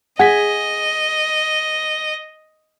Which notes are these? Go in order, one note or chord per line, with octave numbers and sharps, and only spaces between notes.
G#4 D#5 F#5 G#6 B6